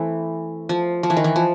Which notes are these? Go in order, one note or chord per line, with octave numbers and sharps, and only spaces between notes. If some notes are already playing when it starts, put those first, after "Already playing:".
Already playing: E3 A3 C4
F3
F3
E3
D#3
E3
F3